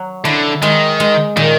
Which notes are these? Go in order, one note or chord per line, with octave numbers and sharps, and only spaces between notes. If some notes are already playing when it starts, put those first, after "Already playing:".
Already playing: F#3
D3 E4
D#3 G#3
G#3
A#2 D#3